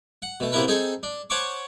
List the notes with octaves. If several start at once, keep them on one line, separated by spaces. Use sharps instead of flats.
F#5
B2 A3
C3 A#3 B3 E4 A#4 B4
C4 D#4 G#4 A4 G#5
D4
C5 C#5 F#5 A5 C#6 D6